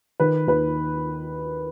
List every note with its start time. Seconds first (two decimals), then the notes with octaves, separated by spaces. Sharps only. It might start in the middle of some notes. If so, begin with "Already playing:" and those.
0.20 D#3 B4
0.47 D#2 B4